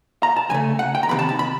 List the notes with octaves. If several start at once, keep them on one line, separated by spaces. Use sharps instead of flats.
A#5
A5
D2 C#3 A3 G#5
F#5
G5
A#5
E2 C3 D#3 B5
A5
A5
B5